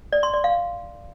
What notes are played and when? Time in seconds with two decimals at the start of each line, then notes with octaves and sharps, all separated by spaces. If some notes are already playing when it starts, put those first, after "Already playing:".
0.13 D5
0.23 C6
0.34 D5
0.44 F5